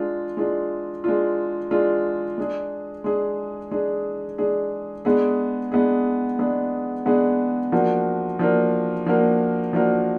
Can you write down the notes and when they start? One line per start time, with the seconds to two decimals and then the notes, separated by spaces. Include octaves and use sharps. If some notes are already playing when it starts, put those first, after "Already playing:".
Already playing: G#3 D4 F4
0.37 G#3 D4 F4
1.04 G#3 D4 F4
1.71 G#3 D4 F4
2.38 G#3 D4 G#4
3.04 G#3 D4 G#4
3.71 G#3 D4 G#4
4.38 G#3 D4 G#4
5.05 G#3 B3 D4 G#4
5.72 G#3 B3 D4 G#4
6.39 G#3 B3 D4 G#4
7.06 G#3 B3 D4 G#4
7.72 F3 A#3 D4 F#4 A#4
8.39 F3 A#3 D4 F#4 A#4
9.06 F3 A#3 D4 F#4 A#4
9.73 F3 A#3 D4 F#4 A#4